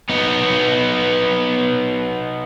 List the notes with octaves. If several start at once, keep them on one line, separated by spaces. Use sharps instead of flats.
B3 D#4